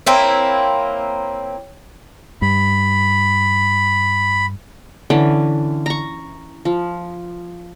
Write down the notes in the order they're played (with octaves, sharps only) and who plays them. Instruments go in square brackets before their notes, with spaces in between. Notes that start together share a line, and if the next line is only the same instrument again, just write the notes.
[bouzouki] A#3 C4 E4 [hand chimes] C#5 G5
[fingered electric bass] G2 [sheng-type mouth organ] B5
[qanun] D3 E3 C#4
A#5 C#6
F3